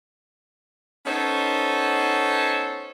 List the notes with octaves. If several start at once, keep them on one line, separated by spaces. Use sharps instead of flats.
B3 C#4 D#4 A4 C5 C#5